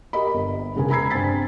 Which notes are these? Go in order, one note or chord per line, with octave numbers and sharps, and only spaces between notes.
G4 A#4 D#5 B5
G1
E1 C#3 A#4 G#5
A#5 B5 E6 G#6 C7
G2 C4 G#5 A6 B6